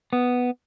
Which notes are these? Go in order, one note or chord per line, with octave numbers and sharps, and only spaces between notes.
B3